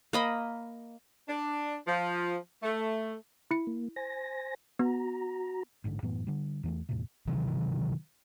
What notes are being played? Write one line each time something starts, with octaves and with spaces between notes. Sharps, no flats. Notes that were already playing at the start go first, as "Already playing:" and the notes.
A#3 D#5 B5
D4
F3
A3
E4 C#7
A#3
C5 G#5 A#6
B3 F#4 A#5
A1 G#2 B2 D3
F#2 A2 E3 B3
D3 G3
E2 E3 A3
E2 A2 C3
C3 D#3 E3 F#3